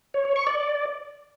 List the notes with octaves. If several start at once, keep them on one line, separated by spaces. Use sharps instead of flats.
C#5
C#5
C#6
D5